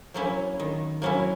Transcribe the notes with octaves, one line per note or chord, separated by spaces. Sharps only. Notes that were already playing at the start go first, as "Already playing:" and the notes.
F#3 A#3 C#4 E4
D#3
F#3 A#3 C#4 E4